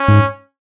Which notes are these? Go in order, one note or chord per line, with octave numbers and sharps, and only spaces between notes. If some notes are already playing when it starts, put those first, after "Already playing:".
Already playing: C#4
G#2